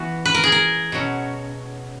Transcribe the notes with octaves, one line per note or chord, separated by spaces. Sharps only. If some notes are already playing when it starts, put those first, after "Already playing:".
Already playing: E3 B3 F#4
B4
A#4
G#4
A#4
B2 F#3 C#4